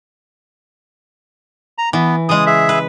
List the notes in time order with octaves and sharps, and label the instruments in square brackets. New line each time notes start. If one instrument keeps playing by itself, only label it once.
[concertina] A#5
[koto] E3 [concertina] B3
[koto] C#3 G#3 [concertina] D#6
[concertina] G#4 E5
[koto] B4